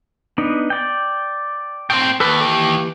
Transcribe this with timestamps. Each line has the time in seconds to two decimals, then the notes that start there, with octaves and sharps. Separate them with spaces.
0.38 B3 D4 D#4
0.70 D5 G5
1.90 A2 C4 G5
2.20 D#2 A4 B4
2.40 E3 G4 D6